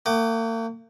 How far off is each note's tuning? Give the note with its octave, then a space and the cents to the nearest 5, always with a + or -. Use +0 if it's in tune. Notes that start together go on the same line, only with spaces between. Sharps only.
A#3 -45 F#5 +45 D6 +30